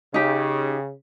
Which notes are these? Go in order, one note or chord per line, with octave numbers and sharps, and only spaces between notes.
C#3 D#4 G4